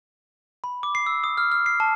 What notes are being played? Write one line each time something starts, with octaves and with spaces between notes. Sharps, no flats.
B5
D6
C7
E6
D#6
F6
F6
C7
A5